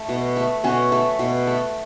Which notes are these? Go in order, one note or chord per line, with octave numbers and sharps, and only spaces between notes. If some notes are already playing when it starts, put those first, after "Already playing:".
Already playing: A3 A4
B2
A3
B2 C#4 F#4
A3
B2
A3